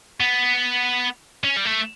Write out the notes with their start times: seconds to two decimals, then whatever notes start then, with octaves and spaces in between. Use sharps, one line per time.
0.20 B3
1.45 C#4
1.57 G3
1.65 A3